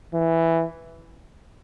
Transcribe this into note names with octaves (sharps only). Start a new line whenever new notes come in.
E3